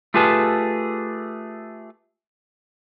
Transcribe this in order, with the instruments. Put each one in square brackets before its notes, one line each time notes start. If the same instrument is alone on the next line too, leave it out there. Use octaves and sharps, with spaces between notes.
[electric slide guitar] A3 F4 G4 G#4 B4 A5